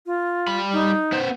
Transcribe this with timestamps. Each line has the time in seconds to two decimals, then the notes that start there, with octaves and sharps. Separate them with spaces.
0.06 F4
0.47 G3 B5
0.73 D#4
1.12 B3 C5